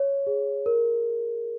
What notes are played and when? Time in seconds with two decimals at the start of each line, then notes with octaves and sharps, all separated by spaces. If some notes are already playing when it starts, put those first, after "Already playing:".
Already playing: C#5
0.27 G#4
0.66 A#4